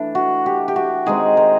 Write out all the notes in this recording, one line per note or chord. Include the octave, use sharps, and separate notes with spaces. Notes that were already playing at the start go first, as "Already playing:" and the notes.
Already playing: E3 A3 D4
F#4
G4
G4
F#4
D#3 G#3 C4 D#4 G#4
A#4